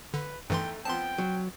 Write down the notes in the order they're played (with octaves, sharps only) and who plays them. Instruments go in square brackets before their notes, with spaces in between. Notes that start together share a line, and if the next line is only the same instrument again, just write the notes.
[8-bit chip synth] D3 [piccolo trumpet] B4
[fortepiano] E2 A3 D#4 [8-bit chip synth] G2 E3 C6 [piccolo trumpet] G5
[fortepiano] F3 B3 C4 [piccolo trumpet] G5 [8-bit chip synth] A5 C6
[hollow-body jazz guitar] F#3